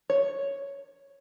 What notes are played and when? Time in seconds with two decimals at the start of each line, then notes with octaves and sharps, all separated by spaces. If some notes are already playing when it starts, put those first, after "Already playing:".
0.10 C#5